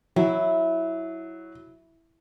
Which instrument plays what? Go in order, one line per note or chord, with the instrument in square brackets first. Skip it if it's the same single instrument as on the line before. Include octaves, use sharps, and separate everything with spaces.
[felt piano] F#3 [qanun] E4